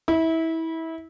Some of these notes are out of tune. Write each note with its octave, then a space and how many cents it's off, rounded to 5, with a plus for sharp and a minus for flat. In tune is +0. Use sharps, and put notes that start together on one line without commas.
E4 -25